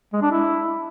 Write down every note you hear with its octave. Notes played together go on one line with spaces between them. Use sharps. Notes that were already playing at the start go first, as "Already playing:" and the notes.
G#3
D4
E4